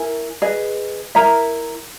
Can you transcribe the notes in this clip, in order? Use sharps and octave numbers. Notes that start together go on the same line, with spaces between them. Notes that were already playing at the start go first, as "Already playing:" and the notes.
Already playing: E4 A#4 G#5
G#4 B4 D#5
E4 A#4 E5 A#5